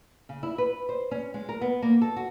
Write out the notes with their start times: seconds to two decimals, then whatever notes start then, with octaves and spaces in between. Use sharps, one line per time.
0.29 C#3
0.43 E4
0.58 B4
0.89 C5
1.11 C#4
1.34 G#3
1.49 A#4
1.61 B3
1.82 A#3
2.02 A4
2.16 F#4